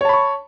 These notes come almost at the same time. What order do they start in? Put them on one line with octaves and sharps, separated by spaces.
C#5 A5 B5 C#6